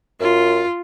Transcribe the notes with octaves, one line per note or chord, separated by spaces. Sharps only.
F#2 F4